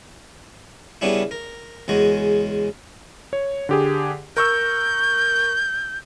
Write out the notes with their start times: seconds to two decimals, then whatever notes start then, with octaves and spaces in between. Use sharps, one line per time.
1.01 C#3 G3 B3 C#4 D4 E4
1.31 A#4
1.88 E2 C#3 G#3 F#4
3.33 C#5
3.69 D3 G4 G#4
4.37 A#4 C#6 E6 G6